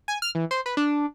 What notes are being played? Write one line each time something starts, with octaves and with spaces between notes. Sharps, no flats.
G#5
F6
E3
C5
B4
D4